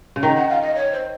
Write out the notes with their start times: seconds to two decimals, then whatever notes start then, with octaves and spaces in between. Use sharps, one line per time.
0.16 C#3
0.23 D#3 A#5
0.36 F#5
0.49 F5
0.62 D#5
0.75 C#5
0.92 C5